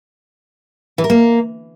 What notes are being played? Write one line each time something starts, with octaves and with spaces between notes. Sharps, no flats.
E3
A#4
A#3